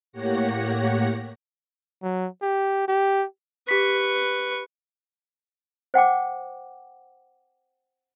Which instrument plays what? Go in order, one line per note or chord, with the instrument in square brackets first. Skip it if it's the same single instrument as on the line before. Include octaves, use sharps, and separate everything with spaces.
[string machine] A2 A#3 G4 C#5 F#5 A#6
[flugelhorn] F#3
G4
G4
[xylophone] G4 B6 [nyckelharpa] B4 C#6
[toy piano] C5 F#5 G5 D6